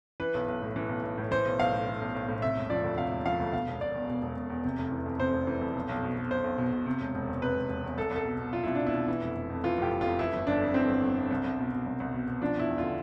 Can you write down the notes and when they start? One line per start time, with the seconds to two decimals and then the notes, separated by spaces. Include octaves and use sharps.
0.20 E3 B4
0.34 B1
0.48 B1
0.62 A2
0.76 E3
0.89 B1
1.03 B1
1.18 A2
1.31 E3 C5
1.46 B1
1.59 B1 F5
1.72 A2
1.87 E3
2.01 B1
2.14 B1
2.28 A2
2.42 C3 E5
2.56 E1
2.70 F3 D5
2.84 D2
2.98 C3 F5
3.11 E1
3.26 F3 F5
3.40 D2
3.53 B2 F5
3.67 E1
3.81 E1 D5
3.95 E2
4.09 B2
4.22 E1
4.37 E1
4.50 E2
4.65 C3
4.78 F1
4.92 E3
5.06 F2
5.20 C3 C5
5.34 F1
5.47 E3
5.61 F2
5.75 B1
5.89 B1
6.03 B2
6.16 B2
6.30 B1 C5
6.44 B1
6.58 B2
6.72 B2
6.86 C3
7.01 E1
7.15 E1
7.27 E2
7.42 C3 B4
7.56 E1
7.69 E1
7.84 E2
7.98 C2 A4
8.11 C2 A4
8.25 B2
8.39 B2
8.53 C2 F4
8.63 C2 E4
8.75 D4
8.80 B2
8.87 E4
8.94 B2
9.08 E3
9.22 F1
9.36 F1
9.50 F2
9.64 E3 F4
9.78 F1 G4
9.91 F1
10.01 F2 F4
10.19 E3 E4
10.33 G1
10.47 G1 D4
10.61 F2
10.74 E3 C4
10.89 G1
11.03 G1
11.17 F2
11.31 C2
11.44 C2
11.59 B2
11.72 B2
11.86 C2
12.00 C2
12.13 B2
12.27 B2
12.41 F3 D4
12.56 E2 E4
12.69 E2
12.78 D3 F4